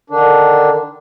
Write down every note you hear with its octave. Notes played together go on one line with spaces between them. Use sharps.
D3 D#3 D4